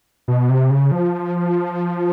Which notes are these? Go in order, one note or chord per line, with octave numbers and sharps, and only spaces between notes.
B2
C3
C#3
F3